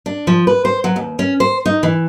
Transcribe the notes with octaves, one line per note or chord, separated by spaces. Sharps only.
D4
F3
B4
C5
F#3
D#2
C#4
C5
D#4
E3